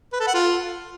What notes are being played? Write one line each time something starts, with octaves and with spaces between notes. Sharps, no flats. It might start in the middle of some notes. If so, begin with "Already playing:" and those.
B4
A4
F#5
F4